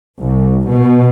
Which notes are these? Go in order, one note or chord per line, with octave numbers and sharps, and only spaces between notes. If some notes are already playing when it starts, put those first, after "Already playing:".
C2
B2